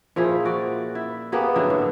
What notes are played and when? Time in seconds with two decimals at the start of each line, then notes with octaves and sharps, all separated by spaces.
0.16 A#2 F3 E4 G#4
0.45 F#4 D5
0.95 E4
1.32 A#3 B3 G4 G#4
1.56 D3 F#3 D4 E4
1.70 A2